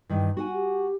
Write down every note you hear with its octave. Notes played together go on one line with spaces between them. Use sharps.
G2 D#3 E3
D#4 F#4 F#5 G#5
G4